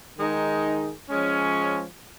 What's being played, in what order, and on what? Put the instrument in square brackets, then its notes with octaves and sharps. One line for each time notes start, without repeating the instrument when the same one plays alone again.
[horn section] D#3 G#3 D#4 G#4
F3 G#3 C#4